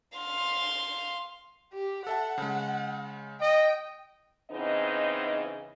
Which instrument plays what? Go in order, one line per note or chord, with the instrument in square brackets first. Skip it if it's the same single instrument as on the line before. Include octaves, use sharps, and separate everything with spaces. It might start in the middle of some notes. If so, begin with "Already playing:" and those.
[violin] F5 C6
[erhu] G4
[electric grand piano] A4 E5 A5 [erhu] F#5
[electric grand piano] C#3 G#3
[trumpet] D#5 [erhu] G5
[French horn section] C#3 E3 B3 C4 D#4 D#5